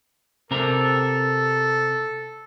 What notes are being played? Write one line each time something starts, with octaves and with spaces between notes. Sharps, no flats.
C3 C4 A4 A#4